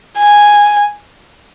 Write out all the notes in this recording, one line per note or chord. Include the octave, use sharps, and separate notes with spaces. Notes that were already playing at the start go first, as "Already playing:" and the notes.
G#5